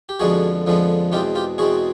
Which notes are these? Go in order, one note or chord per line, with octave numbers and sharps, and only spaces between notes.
G4
F2 D3 F3 G#3 B3 F#4 G#4
F2 D3 F3 G#3 B3
E2 B2 G#3 C4 F4 G4
F4 G4
E2 B2 G#3 C4 F#4 G#4